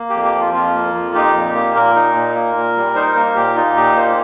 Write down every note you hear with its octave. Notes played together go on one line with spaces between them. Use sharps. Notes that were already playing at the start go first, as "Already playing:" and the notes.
Already playing: A#3
F2 G4
G4
F3
F4
F2 F4
A#3
F2
D#4 G4
A#2
A#3
A#2 A#4
D#4
A#2
A#3
A#2
G3
D#4 C5
A#3 A#4
A#2 G4
D#4 F4
A#2 G4
A#3 C5